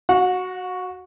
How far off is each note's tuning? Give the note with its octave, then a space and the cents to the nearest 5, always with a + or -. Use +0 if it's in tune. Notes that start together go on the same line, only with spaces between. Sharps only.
F#4 +0 F#5 -35